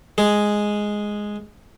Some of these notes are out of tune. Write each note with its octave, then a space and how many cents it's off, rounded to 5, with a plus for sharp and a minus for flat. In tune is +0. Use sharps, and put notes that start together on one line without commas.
G#3 +0 G#4 +0